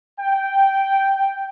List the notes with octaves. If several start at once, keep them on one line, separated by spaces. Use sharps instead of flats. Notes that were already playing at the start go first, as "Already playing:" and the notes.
G5